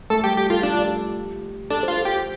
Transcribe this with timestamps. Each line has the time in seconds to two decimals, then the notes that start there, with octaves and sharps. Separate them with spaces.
0.10 A3 A4
0.24 G3 G4
0.37 G4
0.50 F4 A4
0.63 D4 G4
0.74 F4
0.84 G4
1.70 D4 A4
1.83 F4 C5
1.97 A4
2.05 G4